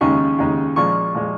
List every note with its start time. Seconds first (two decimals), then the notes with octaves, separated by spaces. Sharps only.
0.01 D#2 C#3 G#3 D#4 C#6
0.38 D#2 C#3 G#3 D#4
0.76 A#2 F3 G#3 C#6
1.14 A#2 F3 G#3